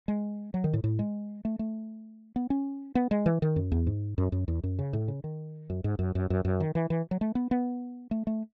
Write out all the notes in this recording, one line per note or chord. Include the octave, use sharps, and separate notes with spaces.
G#3
F#3
D#3
A2
A2
G#3
A3
A3
B3
C#4
B3
G#3
E3
D#3
F#2
E2
G#2
F#2
F#2
E2
F#2
C#3
A2
C#3
D#3
F#2
G#2
F#2
F#2
F#2
F#2
D#3
E3
E3
F#3
A3
B3
B3
A3
A3